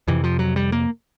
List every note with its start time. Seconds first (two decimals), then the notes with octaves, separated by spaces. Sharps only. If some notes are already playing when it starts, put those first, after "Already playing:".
0.08 F2 C3 E3
0.24 F3
0.39 F#3
0.56 G3
0.72 A#3